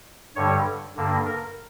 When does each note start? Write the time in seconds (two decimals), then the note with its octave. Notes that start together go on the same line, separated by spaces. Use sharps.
0.36 G2 D3 G3 C#5
0.96 G2 D3 A#3 D4
1.26 A#4